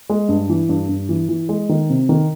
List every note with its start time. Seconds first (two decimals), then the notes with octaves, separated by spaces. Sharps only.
0.10 G#3
0.29 G2
0.49 E3
0.69 G2
0.89 G2
1.09 E3
1.29 E3
1.49 G#3
1.69 D#3
1.90 C3
2.09 D#3